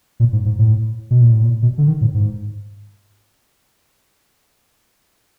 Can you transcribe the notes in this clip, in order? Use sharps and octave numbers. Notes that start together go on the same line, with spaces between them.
A#2
G#2
G#2
A2
B2
A#2
A2
A#2
B2
D3
D#3
A2
G#2